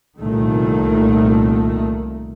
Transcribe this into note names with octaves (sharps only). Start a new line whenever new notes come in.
C2 A#2 D#3 A3